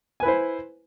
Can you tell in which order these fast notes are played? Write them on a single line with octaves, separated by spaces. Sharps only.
G#5 B4 E4 C5